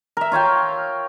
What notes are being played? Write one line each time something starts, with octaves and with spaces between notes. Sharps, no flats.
A#4 E5
F4 C#5 F5 G5